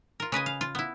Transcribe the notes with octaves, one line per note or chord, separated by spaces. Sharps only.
F4 A#4
C#3 B4 D#5 G#5
F5
F4
B3 E4